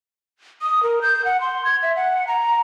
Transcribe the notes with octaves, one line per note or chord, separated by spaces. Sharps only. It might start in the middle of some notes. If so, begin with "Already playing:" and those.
D#6
A#4
G6
F#5
C6
G#6
E5
F#5
A#5